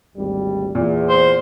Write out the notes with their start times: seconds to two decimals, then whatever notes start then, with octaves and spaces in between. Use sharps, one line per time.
0.16 G#1 D2 G3
0.75 E2 A#2
1.09 C5